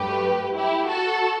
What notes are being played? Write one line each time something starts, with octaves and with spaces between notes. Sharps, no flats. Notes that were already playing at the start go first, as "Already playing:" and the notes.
Already playing: G2 F#3 A3 G4 B4
E4 G4
F#4 A4